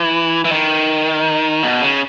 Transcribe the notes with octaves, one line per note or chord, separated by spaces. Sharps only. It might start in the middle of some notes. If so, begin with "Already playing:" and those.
Already playing: E3
E3
D#3
B2
C#3